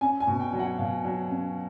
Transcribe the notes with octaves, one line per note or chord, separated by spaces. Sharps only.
C#4 G#5
G#5
B2
G5
F#3
F#5
B2 F5
F#3
C#4